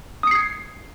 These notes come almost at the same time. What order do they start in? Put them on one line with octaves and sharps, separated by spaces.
D#6 C#7 C7 G#6